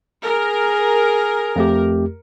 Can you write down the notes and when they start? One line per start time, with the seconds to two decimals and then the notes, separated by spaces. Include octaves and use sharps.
0.25 G#4 A#4
1.56 F2 A3 G4